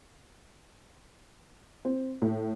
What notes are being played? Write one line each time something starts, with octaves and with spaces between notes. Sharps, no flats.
C4
A2